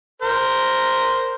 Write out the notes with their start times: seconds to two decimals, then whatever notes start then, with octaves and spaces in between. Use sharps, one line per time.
0.22 A#4 C5